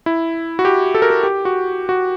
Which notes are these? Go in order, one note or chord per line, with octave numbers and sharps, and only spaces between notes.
E4
F#4
G4
A4
A#4
A4
G4
F#4
F#4